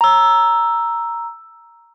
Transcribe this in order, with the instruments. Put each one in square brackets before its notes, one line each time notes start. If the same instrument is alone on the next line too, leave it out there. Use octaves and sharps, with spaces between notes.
[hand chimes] A#5 E6